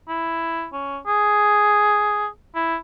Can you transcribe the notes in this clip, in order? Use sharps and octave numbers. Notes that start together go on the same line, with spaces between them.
E4
C#4
G#4
E4